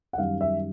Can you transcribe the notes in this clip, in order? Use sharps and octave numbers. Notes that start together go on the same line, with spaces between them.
F#5
F#2 D#3 G3 F5
E5